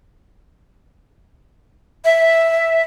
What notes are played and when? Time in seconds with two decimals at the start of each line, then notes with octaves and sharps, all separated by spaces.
2.05 E5